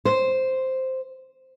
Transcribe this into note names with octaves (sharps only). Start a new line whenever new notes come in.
C5